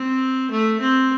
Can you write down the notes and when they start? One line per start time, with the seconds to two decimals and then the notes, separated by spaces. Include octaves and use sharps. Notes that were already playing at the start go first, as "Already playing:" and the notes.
Already playing: C4
0.51 A3
0.81 C4